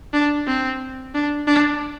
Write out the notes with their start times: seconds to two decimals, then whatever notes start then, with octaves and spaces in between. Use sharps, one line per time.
0.13 D4
0.47 C4
1.15 D4
1.47 D4